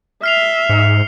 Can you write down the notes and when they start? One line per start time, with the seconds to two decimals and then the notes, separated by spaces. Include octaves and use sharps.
0.23 E5 F6 C7 F7
0.69 G#2 C#7